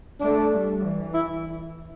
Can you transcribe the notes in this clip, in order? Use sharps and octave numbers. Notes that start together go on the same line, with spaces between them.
A3 D4
G3
E3
E4